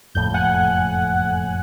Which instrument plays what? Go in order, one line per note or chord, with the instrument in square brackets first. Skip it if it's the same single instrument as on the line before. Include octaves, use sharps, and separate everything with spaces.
[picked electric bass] F#1 F2 A2 [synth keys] G6
[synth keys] F#5 G#5 F#6